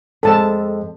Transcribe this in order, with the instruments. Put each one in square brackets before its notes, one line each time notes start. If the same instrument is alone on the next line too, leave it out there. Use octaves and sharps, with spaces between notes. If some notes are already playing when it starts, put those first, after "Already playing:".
[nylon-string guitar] F2 G#3 [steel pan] A4 A5